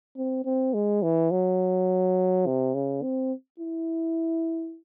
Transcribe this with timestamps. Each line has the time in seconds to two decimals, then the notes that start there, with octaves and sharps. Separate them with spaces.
0.17 C4
0.45 C4
0.74 G#3
1.03 E3
1.31 F#3
2.46 C3
2.74 C#3
3.03 C4
3.60 E4